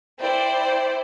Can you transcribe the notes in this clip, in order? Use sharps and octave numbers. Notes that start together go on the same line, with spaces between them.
E4 C5 D5 G5